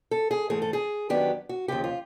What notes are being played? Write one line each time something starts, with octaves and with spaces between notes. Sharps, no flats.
A4
G#4
G#2 E3 A3 G#4
A4
G#4
F#2 D#3 F#3 B3 D4 G4
F#4
D#2 C#3 F3 G4
F4